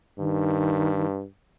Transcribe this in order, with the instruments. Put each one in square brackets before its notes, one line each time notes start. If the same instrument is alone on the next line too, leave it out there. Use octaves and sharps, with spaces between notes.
[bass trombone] G2 [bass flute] D#3